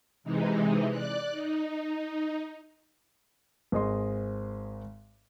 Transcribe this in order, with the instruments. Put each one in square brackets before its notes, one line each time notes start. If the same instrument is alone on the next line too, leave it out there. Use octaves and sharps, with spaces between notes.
[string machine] C3 E3 G#3 D#4
D5 F#6
D#4
[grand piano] G#1 G#4 D#5 C6